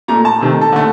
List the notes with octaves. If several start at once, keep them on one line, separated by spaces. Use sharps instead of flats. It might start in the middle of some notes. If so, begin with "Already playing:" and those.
A#2 A3 A#5
A5
C3 D#3 A3
A4
D3 A3